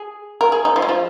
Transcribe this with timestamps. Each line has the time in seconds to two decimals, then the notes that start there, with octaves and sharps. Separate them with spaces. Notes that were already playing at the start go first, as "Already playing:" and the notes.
Already playing: G#4
0.41 A#4
0.52 G#4
0.65 D#4
0.76 F3
0.82 G#3
0.89 F3